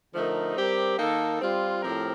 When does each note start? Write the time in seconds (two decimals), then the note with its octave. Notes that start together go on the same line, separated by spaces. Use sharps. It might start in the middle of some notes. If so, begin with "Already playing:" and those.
0.14 D3 F3 A3 D#4 A#4
0.56 G3 C4 G4 A#4
0.98 D#3 A#3 D#4 A4
1.40 G3 C4 F4
1.82 A2 F3 C4 G4 A#4